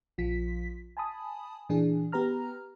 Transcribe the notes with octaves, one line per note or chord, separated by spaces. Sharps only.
A#1 F3 F4 B6
G#5 A5 B5 D#6
A#2 E3 D4 G#4
B3 G4 B4 A#5 F6